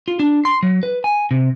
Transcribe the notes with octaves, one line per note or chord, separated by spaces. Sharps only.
F4
D4
C6
F#3
B4
G#5
C3